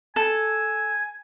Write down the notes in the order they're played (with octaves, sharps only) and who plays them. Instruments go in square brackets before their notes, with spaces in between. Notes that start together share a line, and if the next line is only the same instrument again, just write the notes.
[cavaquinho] A4 [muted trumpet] G#5